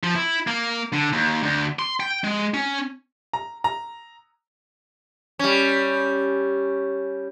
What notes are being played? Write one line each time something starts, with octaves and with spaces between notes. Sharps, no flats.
F3
E4
A#3
D3
D#2
D2
C6
G5
G#3
C#4
A#5
A#5
G3 C#4